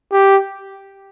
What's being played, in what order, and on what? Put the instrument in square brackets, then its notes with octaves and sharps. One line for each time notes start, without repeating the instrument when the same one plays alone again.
[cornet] G4